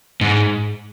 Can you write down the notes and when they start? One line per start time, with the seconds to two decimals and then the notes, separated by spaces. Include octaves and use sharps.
0.21 G#2